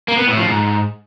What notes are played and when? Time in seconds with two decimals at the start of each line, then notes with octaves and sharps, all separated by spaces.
0.08 A#3
0.18 B3
0.28 A2
0.37 F3
0.47 G#2